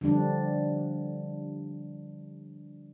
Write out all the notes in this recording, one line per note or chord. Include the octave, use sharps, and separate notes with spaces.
D3 F3 G3 D4